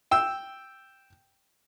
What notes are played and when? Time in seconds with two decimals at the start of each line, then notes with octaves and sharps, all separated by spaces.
0.11 G5 E6